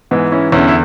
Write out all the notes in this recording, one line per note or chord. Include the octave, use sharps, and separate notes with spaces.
G#2 E3 G#3 B3
C#4 E4
E2 D3 C#4 E4
E4